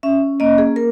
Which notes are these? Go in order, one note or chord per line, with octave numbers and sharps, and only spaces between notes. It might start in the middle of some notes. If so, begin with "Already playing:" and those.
C#4 E5
A#3 D#5
G#4
A#4